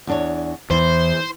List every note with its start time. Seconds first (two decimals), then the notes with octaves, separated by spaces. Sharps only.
0.07 E2 D4 C#5
0.70 E2 E3 C5